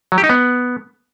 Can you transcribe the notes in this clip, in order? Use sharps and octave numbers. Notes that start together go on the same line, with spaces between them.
F#3
G4
D#4
B3